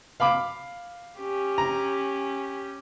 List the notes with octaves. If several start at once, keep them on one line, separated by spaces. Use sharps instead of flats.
F5 B5 D6
C#4 G4
A#5